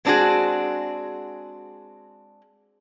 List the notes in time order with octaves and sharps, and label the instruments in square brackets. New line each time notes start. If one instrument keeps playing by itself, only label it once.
[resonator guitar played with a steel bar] G#3 C4 D4 E4 F#4 G#4